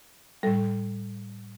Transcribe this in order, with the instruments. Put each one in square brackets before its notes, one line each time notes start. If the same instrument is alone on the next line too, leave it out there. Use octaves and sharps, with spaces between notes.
[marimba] A2 G3 A4